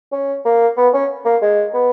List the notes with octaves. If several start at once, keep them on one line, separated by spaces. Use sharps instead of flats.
C#4
A#3
B3
C#4
A#3
G#3
B3